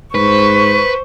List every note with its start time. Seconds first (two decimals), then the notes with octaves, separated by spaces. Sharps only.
0.15 G#2 B4 C5 C#6